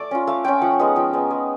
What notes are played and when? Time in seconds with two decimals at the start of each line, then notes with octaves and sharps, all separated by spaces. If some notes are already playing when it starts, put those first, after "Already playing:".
Already playing: A3 D5
0.11 C#4 F4
0.27 A3 F5
0.44 C#4 F4 G5
0.61 F3 F#5
0.79 G#3 B3 D#4
0.96 F3 G5
1.13 G#3 B3 D#4
1.31 G#3